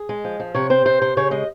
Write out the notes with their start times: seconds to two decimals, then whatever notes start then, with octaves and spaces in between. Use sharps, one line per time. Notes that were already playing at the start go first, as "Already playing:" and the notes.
Already playing: G#4
0.09 G#3
0.24 F3
0.40 F3
0.55 C3 C#5
0.70 C4 C5
0.85 C3 C5
1.01 C3 C5
1.17 C#3 C#5
1.31 G#3 D#5